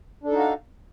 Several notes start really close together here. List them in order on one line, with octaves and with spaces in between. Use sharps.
D4 A4 D#4 F#4 F5